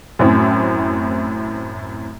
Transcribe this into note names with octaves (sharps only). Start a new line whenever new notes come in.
F#2 A2 C4